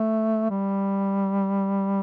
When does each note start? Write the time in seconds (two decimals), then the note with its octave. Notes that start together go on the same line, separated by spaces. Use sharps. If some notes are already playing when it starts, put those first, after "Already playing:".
Already playing: A3
0.50 G3